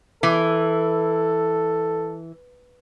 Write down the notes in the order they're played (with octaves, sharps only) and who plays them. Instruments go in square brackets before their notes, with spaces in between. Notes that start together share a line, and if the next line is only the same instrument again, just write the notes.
[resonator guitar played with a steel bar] E3 [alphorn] A4